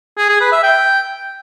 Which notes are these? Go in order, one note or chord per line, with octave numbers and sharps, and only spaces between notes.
G#4
G#4
B4
E5
G5